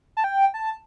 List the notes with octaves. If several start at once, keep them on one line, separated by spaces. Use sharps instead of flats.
A5
G5
A5